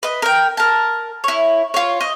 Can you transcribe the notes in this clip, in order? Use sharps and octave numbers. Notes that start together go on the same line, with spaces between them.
B4 D#5
A#4 G5
A#4 A5
E4 C#5
F4 C#5
D#5